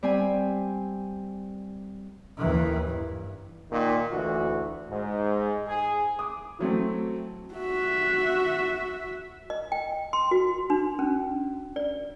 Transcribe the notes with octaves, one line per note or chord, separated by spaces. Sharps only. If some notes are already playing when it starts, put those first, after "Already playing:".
G3 C4 G#5
D#2 E3
G2
A#2 D#3
D2 E3 F#4
G#2
G#4
D6 D#6
E3 F#3 A3 C4
F#4 E5
D#5
G5
C6
F#4
D4
C#4
D5